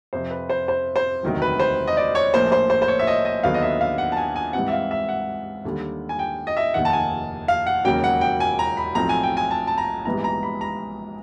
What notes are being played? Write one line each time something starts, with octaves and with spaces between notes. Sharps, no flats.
F2 C3 F3 C5
B4
C5
C5
C5
E1 D2 C3 D#3 F#3
B4
C5
D#5
D5
C#5
A#1 A2 F3 A#3 C5
C5
C5
C5
C#5
E5
D#5
D#5
D#2 D3 F#3 B3 D4 F5
D#5
E5
F5
F#5
A5
G#5
G#5
G#2 E3 G3 C4 F#5
E5
F5
E5
F#5
D#2 D3 G3
G#5
G5
D#5
E5
F1 D#2 D#3 F#5
A5
G#5
F5
F#5
E1 D#2 C#3 F#3 A#3 G5
F#5
G5
G#5
A#5
B5
B1 A2 F3 A3 C4 A#5
G#5
G5
G#5
A5
A5
A#5
A#1 G#2 E3 G3 B3 A#5
A#5
B5
A#5